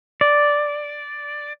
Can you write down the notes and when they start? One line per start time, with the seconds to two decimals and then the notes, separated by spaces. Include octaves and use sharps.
0.21 D5